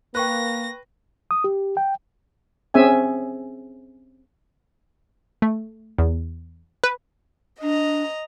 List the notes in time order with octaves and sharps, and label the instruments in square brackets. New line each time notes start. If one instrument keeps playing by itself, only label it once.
[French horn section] A#3 [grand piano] B4 [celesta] G5 C#6 F#6 [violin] A#6
[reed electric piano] D#6
G4
G5
[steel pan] C4 C#4 G#4 E5 G#5
[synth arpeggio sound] A3
E2
B4
[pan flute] D4 [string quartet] D#5 A#5